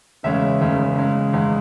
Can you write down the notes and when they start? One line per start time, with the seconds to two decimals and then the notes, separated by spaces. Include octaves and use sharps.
0.23 E1 E2 C#3 G#3 C#4 E5
0.60 E1 E2 C#3 G#3 C#4
0.96 E2 C#3 G#3
1.33 E2 C#3 G#3